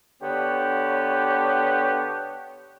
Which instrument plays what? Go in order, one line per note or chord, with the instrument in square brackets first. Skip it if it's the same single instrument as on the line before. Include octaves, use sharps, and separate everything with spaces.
[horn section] D3 B3 G4 C#5